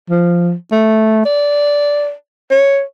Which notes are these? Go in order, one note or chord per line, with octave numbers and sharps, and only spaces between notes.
F3
A3
D5
C#5